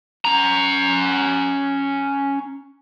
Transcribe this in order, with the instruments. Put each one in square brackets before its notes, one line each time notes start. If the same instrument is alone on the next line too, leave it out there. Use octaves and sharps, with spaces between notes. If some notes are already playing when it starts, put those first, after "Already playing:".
[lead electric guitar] C#4 A#5